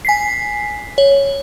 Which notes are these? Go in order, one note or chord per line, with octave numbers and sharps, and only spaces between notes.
G#5 B6 C7
C#5